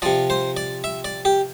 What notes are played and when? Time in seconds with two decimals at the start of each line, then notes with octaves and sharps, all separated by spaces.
0.02 C3 F3 D5
0.30 C5
0.57 D5
0.84 E5
1.05 D5
1.25 G4